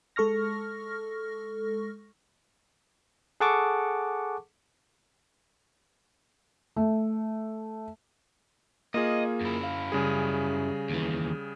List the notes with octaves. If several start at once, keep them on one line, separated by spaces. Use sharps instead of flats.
G#3 A4 C#6 F6 A#6
G#4 A4 F#5 A5 C#6 D6
A3
A#3 F4 G#4 D#5
F#2 E4
F5
C#3 G3 G#4
D#2 E3